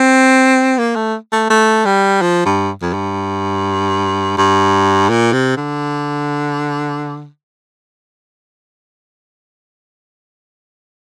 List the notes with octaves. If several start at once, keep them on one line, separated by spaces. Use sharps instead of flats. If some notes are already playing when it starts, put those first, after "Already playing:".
Already playing: C4
A#3
A3
A3
A3
G3
F3
G2
F2
G2
G2
A#2
C3
D3